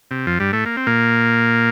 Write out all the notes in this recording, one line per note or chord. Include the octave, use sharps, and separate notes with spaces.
C3
F2 F3
G2 G3
A2 A3
A#3
C4
A#2 A#3